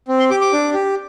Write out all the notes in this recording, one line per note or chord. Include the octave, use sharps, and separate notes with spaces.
C4
C6
G4 D6
D6
D4
G4